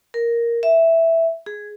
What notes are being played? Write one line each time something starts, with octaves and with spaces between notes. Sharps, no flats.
A#4
E5
G#4